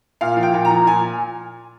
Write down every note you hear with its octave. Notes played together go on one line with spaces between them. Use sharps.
A#2 F5
F3
G5
A#2
A#5
F3
A#2 G#5